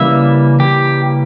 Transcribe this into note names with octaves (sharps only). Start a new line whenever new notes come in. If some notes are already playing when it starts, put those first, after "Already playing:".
Already playing: C#3 E3 G3 A#3 E5
G4